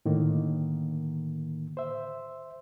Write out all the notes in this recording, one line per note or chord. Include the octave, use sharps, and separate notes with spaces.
A2 D3 D#3 A#3
C5 E5